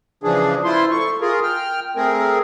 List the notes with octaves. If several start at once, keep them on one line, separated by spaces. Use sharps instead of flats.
C#3 E3 F3 D4 G#4
E4 F4 C5 C6
A3 C#6
F4 G#4 A#4
G5 F6
A3 C4 G#4 A#4